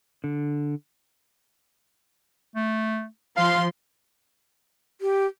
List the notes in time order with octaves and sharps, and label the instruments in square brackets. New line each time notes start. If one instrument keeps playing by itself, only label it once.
[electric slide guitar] D3
[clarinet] A3
[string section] F3 C6 [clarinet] F5
[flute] G4